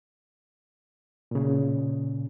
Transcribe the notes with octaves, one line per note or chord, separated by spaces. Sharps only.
A#2 C#3